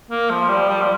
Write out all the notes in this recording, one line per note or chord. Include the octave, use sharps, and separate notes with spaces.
A#3
F3
G3
G3
F3